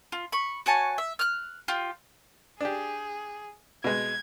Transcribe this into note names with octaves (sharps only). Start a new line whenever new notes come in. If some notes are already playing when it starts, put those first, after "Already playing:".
F4
B5 C#6
F#4 C#5 G#5 A5
E5
F6 F#6
F4 G4
D4 G4 G#4
B2 G#3 G#6